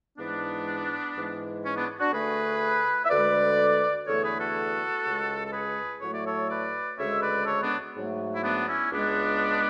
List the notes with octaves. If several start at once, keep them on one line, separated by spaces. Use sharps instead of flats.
G#2 E3 G#3 B3 D4
G#2 E3 G#3
C#4
B3 D4
D4 F#4
D2 D3 A3 G#4 B4
E5
D2 D3 G#3 B4 D5
E2 D3 A3 A4 C#5
G#4 B4
F#4 A4
C#2 C#3 G#3
A4
G#4 B4
A2 F#3 A3 C#5
D5
A4 C#5
B4 D5
D2 C#3 G#3 C#5 E5
B4 D5
A4 C#5
B3 D4
G#2 F#3 A3
E4
B3 D4
C#4 E4
C#2 C#3 G#3 B3 D4